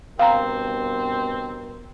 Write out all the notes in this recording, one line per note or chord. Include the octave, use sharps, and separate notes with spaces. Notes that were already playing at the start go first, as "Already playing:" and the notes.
G2 B2 C4 A#4 F5 A#5